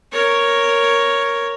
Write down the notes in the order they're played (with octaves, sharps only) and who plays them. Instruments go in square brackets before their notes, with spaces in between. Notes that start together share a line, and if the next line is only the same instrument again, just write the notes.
[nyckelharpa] A#4 C#5